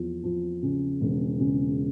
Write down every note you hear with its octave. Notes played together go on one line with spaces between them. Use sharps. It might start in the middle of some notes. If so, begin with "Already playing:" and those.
Already playing: E2 F3
F3
C#3
E1
C#3